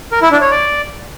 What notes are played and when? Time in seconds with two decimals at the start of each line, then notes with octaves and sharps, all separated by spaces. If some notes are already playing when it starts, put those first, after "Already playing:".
0.12 A#4
0.22 E4
0.31 D4
0.41 C#5
0.51 D5